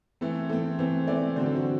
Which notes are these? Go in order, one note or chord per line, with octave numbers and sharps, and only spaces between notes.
E3 A3 C4 A4
E3 A3 C4 A4
E3 A3 C4 C5
E3 A3 C4 D5
D3 F#3 C4 C5
A4
F#4